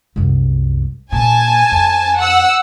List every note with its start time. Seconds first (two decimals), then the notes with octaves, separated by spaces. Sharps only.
0.16 C2 F#2
1.12 A#2 G#5 A5
1.72 F2
2.19 F#5 E6